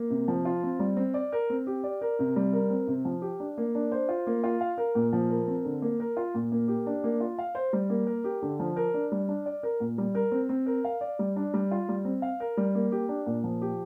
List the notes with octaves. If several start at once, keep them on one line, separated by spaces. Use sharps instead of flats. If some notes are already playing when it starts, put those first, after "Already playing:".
Already playing: A#3
C3
F3
F4
C4
G3
C4
D5
A#4
C4
G4
D5
A#4
C3
G3
A#4
C4
C3
F3
G4
D4
A#3
D4
C5
F4
A#3
F4
F5
A#4
A#2
F3
A#4
C4
D3
A#3
A#4
F4
A#2
A#3
G4
D4
A#3
F4
F5
C5
G3
A#3
A#4
G4
D3
F3
A#4
D4
G3
D4
D5
A#4
A#2
G3
A#4
C4
C4
A#4
F5
D5
G3
D4
G3
F4
G3
C4
F5
A#4
G3
A#3
G4
D4
A#2
F3
G4